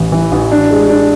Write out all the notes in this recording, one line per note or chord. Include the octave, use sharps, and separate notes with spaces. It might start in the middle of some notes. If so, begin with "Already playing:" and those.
Already playing: A1 E3
E3
A1
D4
G#3
D4